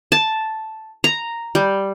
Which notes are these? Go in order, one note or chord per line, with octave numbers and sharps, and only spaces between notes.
A5
A#5
G3